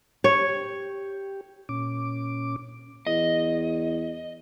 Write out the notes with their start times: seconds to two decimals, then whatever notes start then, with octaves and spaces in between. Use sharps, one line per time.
0.24 G4 C#5
1.69 A#2 C#4 D6
3.07 E2 D#5